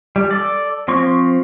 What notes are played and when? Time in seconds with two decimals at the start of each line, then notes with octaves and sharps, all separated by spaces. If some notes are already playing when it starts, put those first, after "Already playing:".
0.16 G3
0.31 A4 D5
0.88 F3 C4 C6 C#6